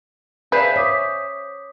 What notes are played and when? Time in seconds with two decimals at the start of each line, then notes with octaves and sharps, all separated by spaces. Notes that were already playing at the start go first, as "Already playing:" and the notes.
0.52 G#4 B4 C5 D5 E5 F5 G#5
0.76 C#5 D6 D#6 B6